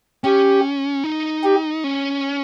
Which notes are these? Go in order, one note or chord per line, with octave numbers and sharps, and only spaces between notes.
C#4 G4
D#4
G4
C#4